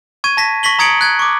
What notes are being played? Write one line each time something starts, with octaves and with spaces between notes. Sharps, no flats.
C#6 G#6 D#7
A5 A#6 B6
C#6 A#6 B6 F#7 G7
A#5 D#6 G#6 C#7 D7 F#7
F#6 G#6
C#6 D6